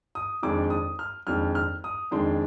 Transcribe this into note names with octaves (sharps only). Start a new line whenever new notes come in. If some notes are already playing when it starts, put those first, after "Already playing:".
D#6
F2 D#3 G#3 D4 D6
D#6
F6
F2 D#3 G#3 D4 F6
F6
D#6
F2 D#3 G#3 D4 C6